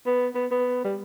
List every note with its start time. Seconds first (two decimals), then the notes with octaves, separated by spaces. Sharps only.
0.06 B3
0.35 B3
0.51 B3
0.84 G3